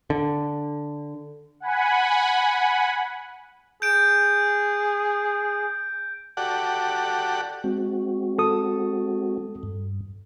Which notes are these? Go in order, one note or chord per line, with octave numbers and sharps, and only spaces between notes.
D3
F#5 G#5 B5
G#4 G6 D7
F#4 G4 A4 D5 F#5
G#3 C4 F#4
A4 D#6
G2